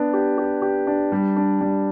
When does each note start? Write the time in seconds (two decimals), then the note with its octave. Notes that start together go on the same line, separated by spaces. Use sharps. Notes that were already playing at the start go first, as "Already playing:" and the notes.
Already playing: B3 D4
0.13 G4
0.38 G4
0.62 G4
0.87 D4
1.12 G3
1.36 D4
1.61 G3